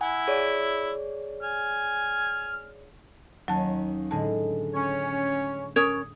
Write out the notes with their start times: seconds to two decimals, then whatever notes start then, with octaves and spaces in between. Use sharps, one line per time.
0.01 E4 F#5 G#5
0.28 G#4 C#5 D5
1.43 G#5 F6
3.48 D#2 F#3 C#4 A5
4.11 A2 D3 G#3 A5
4.74 C#4 C#5
5.76 C#4 A#4 C#5 D#6 G#6